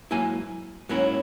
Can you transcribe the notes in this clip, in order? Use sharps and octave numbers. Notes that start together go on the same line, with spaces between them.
G#2 F#3 A#3 E4 G#5
G#2 F#3 A#3 C#4 E4